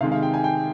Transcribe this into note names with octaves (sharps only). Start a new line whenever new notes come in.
C3 D#3 G#3 F5
F5
G5
G#5
G5